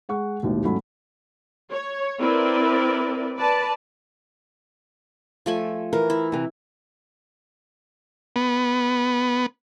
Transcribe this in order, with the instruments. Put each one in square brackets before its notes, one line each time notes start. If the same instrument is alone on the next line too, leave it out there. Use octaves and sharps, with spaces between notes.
[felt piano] G#3 F#5 C#6
A1 D#2 G#2 B2 D#3
G#1 F#3 A3 C#4 B5
[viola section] C#5
C4 E4 A#4 B4 D5
B4 D5 A5
[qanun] F3 A3 G#5
[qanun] E3 [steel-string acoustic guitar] A#4
[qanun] E4
[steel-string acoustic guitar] C3 E3
[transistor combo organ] B3